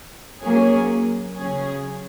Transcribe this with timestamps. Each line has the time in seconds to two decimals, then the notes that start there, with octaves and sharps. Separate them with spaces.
0.42 F#3 A#3 C#4 G#4
1.36 C#3 F#3 C#4 G#4